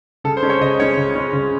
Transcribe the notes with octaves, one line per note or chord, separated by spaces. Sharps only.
C#3 A4
C5
G#3 C#4
C#5
C#3 D#5
G#3 C#4 C#5
C#3
G#3 C#4
C#3